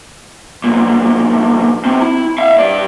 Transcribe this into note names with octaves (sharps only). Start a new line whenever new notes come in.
B1 A#2
B2 C4
E4
E5 F5
G2 D5